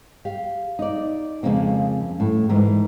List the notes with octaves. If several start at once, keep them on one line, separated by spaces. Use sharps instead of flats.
G4 F5
D#4 D5
F2 C#3 G#3 A#3 C4
A2
G#2 E3 A#4